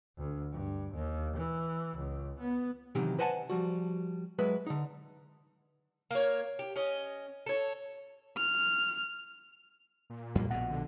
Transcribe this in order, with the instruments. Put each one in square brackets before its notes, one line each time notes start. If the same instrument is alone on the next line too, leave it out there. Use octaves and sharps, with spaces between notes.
[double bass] D2
G2
D#2
E3
C#2
B3
[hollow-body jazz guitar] C3 D#3 E3 F#3 D#4 G4
B4 C5 D#5 F#5 G#5 A5
F3 G3 F#4
F#3 G#3 B4 E5
D3 D#4
[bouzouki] A#3 C#5
G4
C#4 D#5
A4 C#5
[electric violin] F6
[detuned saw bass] A#2
[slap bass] F2 A#3 [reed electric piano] G3
[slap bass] A#1 B2 [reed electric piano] F#5
[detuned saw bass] D3